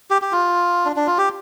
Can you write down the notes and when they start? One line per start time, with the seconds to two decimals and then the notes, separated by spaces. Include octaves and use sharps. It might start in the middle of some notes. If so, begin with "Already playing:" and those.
0.11 G4
0.22 G4
0.32 F4
0.85 D4
0.96 D4
1.07 F4
1.18 G4